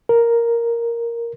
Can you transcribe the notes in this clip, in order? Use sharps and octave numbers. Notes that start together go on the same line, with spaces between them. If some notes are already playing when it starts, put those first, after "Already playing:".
A#4